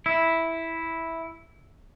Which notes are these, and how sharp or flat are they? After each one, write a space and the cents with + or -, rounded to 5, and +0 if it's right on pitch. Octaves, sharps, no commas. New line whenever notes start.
E4 -5